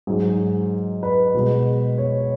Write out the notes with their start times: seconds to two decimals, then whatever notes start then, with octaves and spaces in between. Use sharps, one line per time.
0.07 G#2 F#3 G#4
1.03 B4
1.34 B2 G#3
1.98 C#5